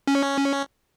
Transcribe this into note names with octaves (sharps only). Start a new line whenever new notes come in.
C#4